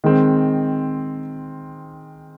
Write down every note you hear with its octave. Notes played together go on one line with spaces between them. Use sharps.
D#3 G#3 C4